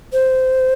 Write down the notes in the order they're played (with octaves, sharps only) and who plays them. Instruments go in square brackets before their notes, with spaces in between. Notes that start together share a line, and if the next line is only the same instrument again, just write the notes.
[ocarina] C5